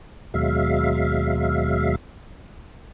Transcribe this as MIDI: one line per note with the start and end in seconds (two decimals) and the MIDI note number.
0.34 1.96 39
0.34 1.96 47
0.34 1.96 54
0.34 1.96 56
0.34 1.96 76
0.34 1.96 77